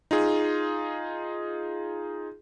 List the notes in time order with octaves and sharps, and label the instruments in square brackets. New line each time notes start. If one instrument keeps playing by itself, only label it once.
[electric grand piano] D#4 F4 G#4